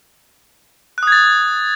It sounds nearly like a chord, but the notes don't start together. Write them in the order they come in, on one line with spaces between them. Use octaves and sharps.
F#6 D#6 G#6 A6